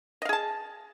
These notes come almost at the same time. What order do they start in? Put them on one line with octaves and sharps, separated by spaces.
D#5 F5 G#4 A5